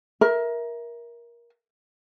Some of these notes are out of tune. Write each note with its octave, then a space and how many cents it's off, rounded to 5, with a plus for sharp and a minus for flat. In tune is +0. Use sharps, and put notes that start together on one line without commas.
A#4 +20 E5 -5